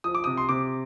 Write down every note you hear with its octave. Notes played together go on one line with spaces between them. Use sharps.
F3 D#6
D6
C3 D#6
C6
C3 D6